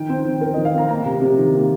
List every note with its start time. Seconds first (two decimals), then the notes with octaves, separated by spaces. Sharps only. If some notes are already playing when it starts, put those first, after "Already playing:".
Already playing: D#3 G5
0.09 C4
0.25 D#3
0.41 C4 A#4
0.54 D#5
0.57 D#3
0.65 F5
0.74 C4 A#5
0.89 A#3 A#5
1.05 C3
1.21 C3
1.38 D#3
1.53 A#3